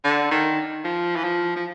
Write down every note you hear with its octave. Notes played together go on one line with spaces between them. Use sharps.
D3
D#3
F3
E3
F3
F3